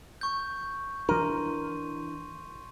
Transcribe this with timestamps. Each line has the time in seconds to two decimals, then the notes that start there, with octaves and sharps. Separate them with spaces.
0.21 C#6 G6
1.09 E3 D4 A#4 C6 D#7